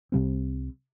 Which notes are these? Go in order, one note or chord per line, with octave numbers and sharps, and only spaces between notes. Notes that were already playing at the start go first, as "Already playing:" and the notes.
C2 C3 G3 C4